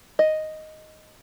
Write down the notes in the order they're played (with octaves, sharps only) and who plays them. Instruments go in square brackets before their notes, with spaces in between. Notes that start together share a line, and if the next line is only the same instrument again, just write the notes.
[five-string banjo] D#5